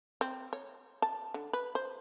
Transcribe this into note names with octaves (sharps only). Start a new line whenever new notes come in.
C4
C#5
A5
D3
B4
C5